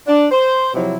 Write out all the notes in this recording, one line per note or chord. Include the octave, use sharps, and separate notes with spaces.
D4
C5
C3 F3 F#3 E4